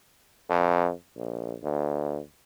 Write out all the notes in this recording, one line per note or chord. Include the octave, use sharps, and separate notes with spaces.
F2
A#1
D2